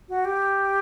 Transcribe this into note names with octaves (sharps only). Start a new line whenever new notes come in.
F#4
G4